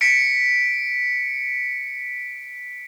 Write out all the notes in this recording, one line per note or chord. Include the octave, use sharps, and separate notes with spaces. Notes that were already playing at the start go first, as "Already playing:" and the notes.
B6 C#7 D7